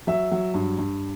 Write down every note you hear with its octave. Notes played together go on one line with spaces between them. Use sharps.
F#3 E5
F#3
G2
G2